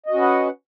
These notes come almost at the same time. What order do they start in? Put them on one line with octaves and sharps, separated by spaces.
D#5 F#4 C#4 B4 F#5